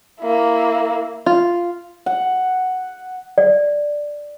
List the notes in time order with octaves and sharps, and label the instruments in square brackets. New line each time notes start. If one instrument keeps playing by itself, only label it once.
[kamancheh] A#3 E4
[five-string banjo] F4
[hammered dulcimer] F#5
[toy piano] D5